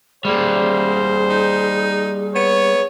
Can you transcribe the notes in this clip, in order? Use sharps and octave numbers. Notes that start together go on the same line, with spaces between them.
G3 A#3 G#4 C5
D#4
B3 C#5